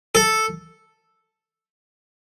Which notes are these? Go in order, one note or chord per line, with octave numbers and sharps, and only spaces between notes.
A4